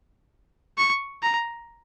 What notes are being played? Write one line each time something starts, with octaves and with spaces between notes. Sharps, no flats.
C#6
A#5